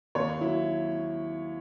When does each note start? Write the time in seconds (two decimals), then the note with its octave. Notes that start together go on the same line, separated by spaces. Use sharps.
0.15 D#2 C#5
0.41 F#3 E4